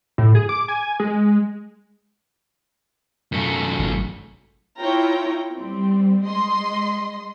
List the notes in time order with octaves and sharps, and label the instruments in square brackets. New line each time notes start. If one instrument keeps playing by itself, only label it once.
[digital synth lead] A2
G#4
D6
G#5
G#3
[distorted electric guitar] F#2 A3
[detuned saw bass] G#1
[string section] E4 F4 C#5 G5 A#5
G3 C4
G#3 D#5 C6